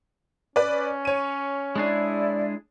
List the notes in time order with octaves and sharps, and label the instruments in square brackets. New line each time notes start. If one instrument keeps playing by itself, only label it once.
[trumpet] C#4 [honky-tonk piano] B4 D5
[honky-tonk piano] C#5 D#7
[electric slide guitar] G#3 D4 G#4 [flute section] E4 D5